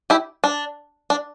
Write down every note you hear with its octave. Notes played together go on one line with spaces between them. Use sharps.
E4 G4
D4
D4